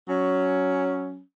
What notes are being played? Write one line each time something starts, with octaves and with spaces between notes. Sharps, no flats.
F#3 C#4